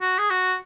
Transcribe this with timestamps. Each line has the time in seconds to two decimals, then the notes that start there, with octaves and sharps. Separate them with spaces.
0.01 F#4
0.19 G#4
0.30 F#4